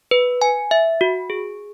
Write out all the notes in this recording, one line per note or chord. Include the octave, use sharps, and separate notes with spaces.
B4
G#5
E5
F#4
G#4